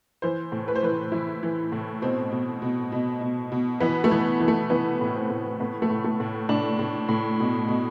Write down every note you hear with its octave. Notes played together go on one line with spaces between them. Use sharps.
E3 C5
A2
B4
C5
E3 B4
E3 E4
E3
A2
B2 C4
B2
B2
B2
B2
B2
E3 B3
A3
E3
E3
A3
E3 B3
A2
C4
A2
A2 B3
A3
A2
A3
A2
A2 D4
A2
A2
B2
B2